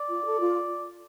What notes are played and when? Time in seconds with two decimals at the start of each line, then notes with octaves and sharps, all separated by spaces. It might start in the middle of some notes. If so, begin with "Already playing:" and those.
Already playing: D5
0.09 F4
0.24 A4
0.40 F4